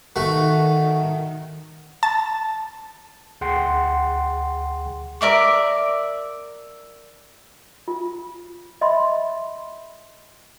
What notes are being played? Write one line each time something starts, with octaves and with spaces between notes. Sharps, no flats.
D#3 A3 F#4
A5
D2 G#4 F#5 G5 C6
A#4 D5 E5 D6
F4
D#5 E5 B5 C6